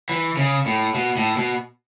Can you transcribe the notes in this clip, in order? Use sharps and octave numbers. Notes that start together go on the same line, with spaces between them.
E3
C#3
A2
B2
A2
B2